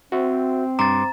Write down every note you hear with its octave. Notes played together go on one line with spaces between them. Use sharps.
C4 F#4 E5
G2 A#5 C6 D6 A6